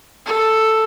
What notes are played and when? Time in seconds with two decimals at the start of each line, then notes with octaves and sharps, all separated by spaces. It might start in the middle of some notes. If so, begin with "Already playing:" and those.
0.26 A4